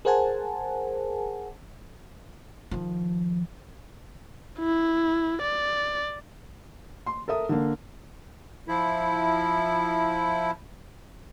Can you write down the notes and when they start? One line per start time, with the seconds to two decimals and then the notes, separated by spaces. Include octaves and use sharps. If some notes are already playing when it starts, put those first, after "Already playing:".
0.05 G#4 A#4 C5 F#5 G#5 A5
2.71 D#3 F3
4.59 E4
5.42 D5
7.06 C6
7.28 A4 A#4 E5 D#6
7.49 D3 A#3
8.68 F3 E4